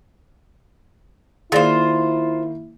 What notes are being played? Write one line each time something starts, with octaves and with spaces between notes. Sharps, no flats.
D#3 A#3 E4 F4 G#4 C5 D5 F5